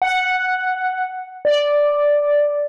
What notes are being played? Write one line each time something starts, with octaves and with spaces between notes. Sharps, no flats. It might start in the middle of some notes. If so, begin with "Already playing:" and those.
F#5
D5